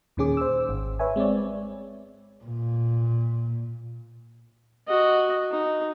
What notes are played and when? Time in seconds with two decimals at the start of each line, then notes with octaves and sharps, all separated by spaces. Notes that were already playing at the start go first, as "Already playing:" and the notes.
0.17 D#2 A#2 D#3 C#4 G#4 D6
0.37 C5 E6
0.69 G#1
0.99 B4 C#5 E5 G#5
1.16 G#3 C4 C#5 D5
2.44 A#2
4.88 F#4 D#5
5.51 D#4